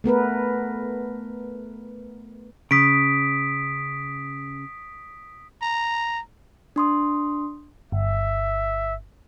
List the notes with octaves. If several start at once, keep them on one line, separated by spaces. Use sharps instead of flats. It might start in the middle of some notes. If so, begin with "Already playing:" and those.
A3 B3 A#4 B4
C#3 D#6 B6 D7
A#5
D4 C6 D#6
G1 E5